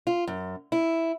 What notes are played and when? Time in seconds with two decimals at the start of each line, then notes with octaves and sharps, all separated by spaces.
0.07 F4
0.27 F#2
0.72 E4